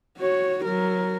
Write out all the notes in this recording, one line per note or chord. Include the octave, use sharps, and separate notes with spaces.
F#4 C#5
F#3 A#4